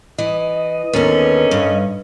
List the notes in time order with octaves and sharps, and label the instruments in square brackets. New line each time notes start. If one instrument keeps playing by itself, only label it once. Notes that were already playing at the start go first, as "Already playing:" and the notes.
[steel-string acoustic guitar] E3 [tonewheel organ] D#5
[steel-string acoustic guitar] D#2 B3 [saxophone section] G#2 D3 C#4 [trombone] A#4
[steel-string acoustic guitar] G2